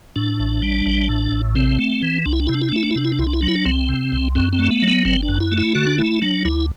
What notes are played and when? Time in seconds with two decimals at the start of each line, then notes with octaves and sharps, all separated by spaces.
0.16 A2 D4
0.39 A1
0.62 G3
0.86 A1
1.09 A2
1.32 A1
1.55 C3 C4
1.79 A3
2.03 E3
2.26 C2 D4
2.33 E4
2.40 D4
2.47 C3 E4
2.54 D4
2.62 E4
2.69 D4
2.72 A3 E4
2.83 D4
2.91 E4
2.96 C3 D4
3.05 E4
3.12 D4
3.19 C2 E4
3.27 D4
3.33 E4
3.41 F#3 D4
3.48 E4
3.56 D4
3.65 C2 C4
3.89 C3
4.12 C2
4.35 F#2 C4
4.53 C4
4.59 A3
4.70 B3
4.82 F#3
4.88 B3
5.05 G1 C4
5.22 D4
5.29 F#2
5.40 E4
5.52 A3
5.58 E4
5.75 D3 F#4
5.87 D4
5.98 A3 E4
6.22 F#3 D4
6.45 D2 E4